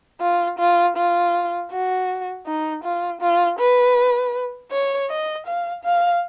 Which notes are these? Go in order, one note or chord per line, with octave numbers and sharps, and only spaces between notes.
F4
F4
F4
F#4
D#4
F4
F4
B4
C#5
D#5
F5
F5